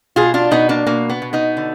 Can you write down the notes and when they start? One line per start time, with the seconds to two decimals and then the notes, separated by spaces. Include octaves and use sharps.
0.16 B2 F4 G#4
0.34 D4 F4
0.51 B2 B3 D#4
0.69 A#3 D4
0.86 B2 A#3
1.09 B3
1.22 B2
1.33 B3 D#4
1.57 D3